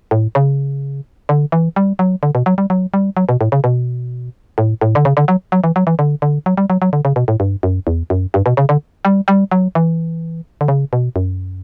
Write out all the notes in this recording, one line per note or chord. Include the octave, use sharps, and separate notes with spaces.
A2
C#3
D3
E3
G3
F#3
D3
B2
F#3
G3
F#3
G3
F#3
B2
A2
C#3
B2
A2
A2
D3
C#3
D3
F#3
F#3
E3
F#3
E3
D3
D3
F#3
G3
F#3
F#3
D3
C#3
B2
A2
G2
F#2
E2
F#2
G2
B2
C#3
D3
G3
G3
F#3
E3
D3
C#3
B2
F#2